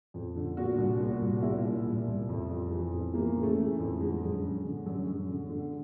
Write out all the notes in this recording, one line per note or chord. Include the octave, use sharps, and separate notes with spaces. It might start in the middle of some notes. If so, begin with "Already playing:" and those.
F2
D3
A#2 F#4
C2
A#2
C2
A#2 E4
A#2
C2
C2
F2
F2
E3
F2
E3 A#3
C#3
A3
E3
F2
D3 G#3
F#2
F#2
D3
F#2
F#2
D3
D3